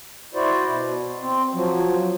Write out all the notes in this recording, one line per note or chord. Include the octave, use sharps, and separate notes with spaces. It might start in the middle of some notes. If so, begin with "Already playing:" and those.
E4 F#4 C5 D5
B2
C4
F3 F#3